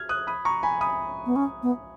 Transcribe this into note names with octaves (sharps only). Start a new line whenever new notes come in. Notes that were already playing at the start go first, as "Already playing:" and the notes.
Already playing: F6 G#6
D#6 F#6
B5 D#6
A#5 C#6
G#5 B5
B5 D#6
B3
C#4
B3